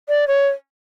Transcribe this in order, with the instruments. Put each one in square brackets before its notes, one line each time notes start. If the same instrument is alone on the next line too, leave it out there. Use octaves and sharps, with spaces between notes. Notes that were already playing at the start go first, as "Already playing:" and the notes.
[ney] D5
C#5